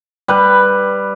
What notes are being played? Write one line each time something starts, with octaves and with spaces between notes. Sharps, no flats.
G3 B4